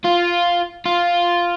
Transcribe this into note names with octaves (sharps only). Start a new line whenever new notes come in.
F4
F4